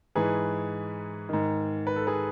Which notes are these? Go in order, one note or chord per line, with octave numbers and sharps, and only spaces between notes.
G#2 E3 G#4 B4
G#2 D#3
B4
A4
G#4 B4